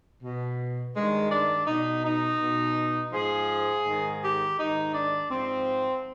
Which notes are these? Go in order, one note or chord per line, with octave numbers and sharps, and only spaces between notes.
B2
G2 D#3 G#3
D4
B2 D#4
D#4
B2
G#2 F3 G#4
G#2 D#3
G4
G#2 D#3 D#4
D4
G#2 F3 C4